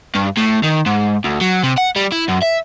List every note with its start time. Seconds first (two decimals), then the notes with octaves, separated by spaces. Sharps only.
0.15 G2
0.37 A2
0.63 D#3
0.86 G#2
1.24 D2
1.41 F#3
1.64 C3
1.78 F#5
1.96 G3
2.12 E4
2.28 F#2
2.42 E5